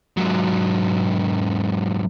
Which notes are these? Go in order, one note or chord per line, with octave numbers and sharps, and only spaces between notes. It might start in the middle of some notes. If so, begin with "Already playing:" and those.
G#2 F#3